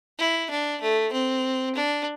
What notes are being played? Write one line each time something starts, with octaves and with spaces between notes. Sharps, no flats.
E4
D4
A3
C4
D4